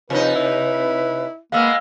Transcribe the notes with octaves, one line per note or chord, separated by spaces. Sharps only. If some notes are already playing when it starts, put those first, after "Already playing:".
C3 F3 D#4 B4
E4
G#3 A#3 B3 F5 E6 F6